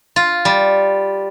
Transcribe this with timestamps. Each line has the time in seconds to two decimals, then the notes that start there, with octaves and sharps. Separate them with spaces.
0.16 F4
0.45 G3